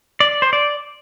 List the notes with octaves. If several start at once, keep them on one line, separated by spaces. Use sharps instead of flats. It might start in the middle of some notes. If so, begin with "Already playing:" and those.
D5
C5
D5